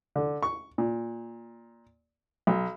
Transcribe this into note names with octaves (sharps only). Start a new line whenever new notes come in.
D3
C#6
A#2
B1